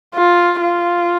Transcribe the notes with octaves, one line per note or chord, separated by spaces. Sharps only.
F4
F4